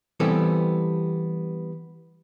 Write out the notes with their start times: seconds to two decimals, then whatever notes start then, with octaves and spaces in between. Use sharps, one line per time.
0.20 E3 G3 B3 C4 A4